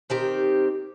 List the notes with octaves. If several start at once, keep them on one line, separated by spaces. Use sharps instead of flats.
D#3 C4 G4